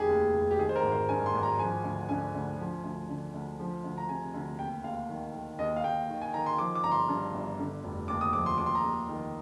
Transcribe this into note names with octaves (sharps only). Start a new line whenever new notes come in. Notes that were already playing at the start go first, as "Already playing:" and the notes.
Already playing: F1 D#3 G4 G#4
D#2
F1
G4
D#3 G#4
C5
A#4
G#1
C5
G2 G#5
C6
G#1
A#5
F3 G#5
D2
D3 G#5
D2
F3
D2
D3
D2
F3
D2
A#5
C3 G#5
D2
D#2 G5
D#2 F5
D#3
D#3
D#2 D#5
F5
D#2 G5
D#3
G#5
D#3 A#5
C6
F3 D6
D6
G1 A#5
C6
G2
G1
D3
F1
D#2 D6
D#6
F3 D6
C6
D#2 D6
C6
A#5
D#2
D#3